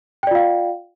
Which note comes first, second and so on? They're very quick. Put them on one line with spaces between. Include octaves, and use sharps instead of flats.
G5 D5 F4 F5